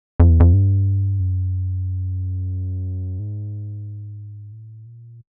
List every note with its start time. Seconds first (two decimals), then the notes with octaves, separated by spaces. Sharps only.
0.20 F2
0.29 E2
0.40 F2
0.53 G2
1.20 F#2
3.19 G#2
4.52 A2
4.86 A#2